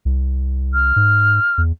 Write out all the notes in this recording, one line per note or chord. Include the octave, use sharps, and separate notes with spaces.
C2
F6
G#2
E2